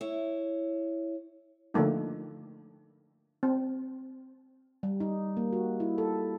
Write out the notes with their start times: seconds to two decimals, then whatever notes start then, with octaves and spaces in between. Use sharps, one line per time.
0.01 E4 C#5
1.74 D3 F3 A3 A#3 D#4
3.43 C4
4.83 G3
5.00 D#4
5.37 A#3
5.53 F#4
5.80 E4
5.98 A4